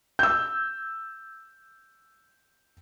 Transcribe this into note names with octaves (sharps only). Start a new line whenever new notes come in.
E6 G6